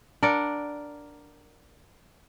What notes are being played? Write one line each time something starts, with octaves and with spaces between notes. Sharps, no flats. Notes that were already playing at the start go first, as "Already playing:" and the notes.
D4 A#4 D5 F#5